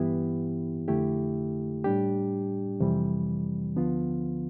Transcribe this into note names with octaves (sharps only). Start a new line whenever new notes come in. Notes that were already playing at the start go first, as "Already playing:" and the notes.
Already playing: G2 E3 B3 E4 G4
F2 D3 A3 E4 G4
A2 G3 D4 G4
F2 C3 E3 G3
D2 D3 F3 B3 F4